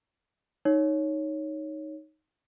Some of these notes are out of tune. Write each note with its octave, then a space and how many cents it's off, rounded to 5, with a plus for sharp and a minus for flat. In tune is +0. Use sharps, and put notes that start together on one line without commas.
D#4 +0 C#5 +0